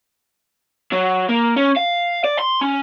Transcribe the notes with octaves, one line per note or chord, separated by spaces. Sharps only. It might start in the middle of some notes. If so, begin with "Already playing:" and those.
F#3
A#3
C#4
F5
D5
C6
C#4